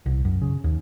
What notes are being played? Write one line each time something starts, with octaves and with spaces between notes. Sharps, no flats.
C2
F#2
C#3
D#2